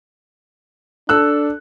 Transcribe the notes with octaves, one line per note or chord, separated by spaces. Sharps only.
D4 A4 E6 F#6